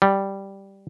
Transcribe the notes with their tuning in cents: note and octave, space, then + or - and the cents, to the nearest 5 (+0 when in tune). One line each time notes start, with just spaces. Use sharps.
G3 -5